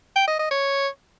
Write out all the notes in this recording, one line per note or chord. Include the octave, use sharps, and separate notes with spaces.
G5
D#5
D#5
C#5